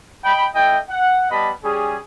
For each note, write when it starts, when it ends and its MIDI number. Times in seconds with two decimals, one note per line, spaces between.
0.24 0.46 75
0.24 0.46 79
0.24 0.46 83
0.54 0.78 57
0.54 0.78 64
0.54 0.78 75
0.54 0.78 79
0.89 1.29 78
1.30 1.51 55
1.30 1.51 59
1.30 1.51 75
1.30 1.51 81
1.30 1.51 83
1.64 1.98 55
1.64 1.98 61
1.64 1.98 68